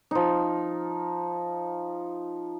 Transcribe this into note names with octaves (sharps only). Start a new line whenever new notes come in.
F3 D#4